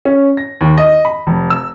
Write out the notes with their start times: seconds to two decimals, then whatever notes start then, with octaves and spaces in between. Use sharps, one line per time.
0.05 C#4
0.37 A#6
0.61 D#2
0.77 D#5
1.05 B5
1.27 F1
1.50 E6